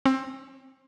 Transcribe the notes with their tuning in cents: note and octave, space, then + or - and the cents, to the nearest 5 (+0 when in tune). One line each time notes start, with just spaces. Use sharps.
C4 +20